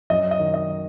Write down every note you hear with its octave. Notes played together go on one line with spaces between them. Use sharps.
F#2 D#5
D#5
D#3
D#5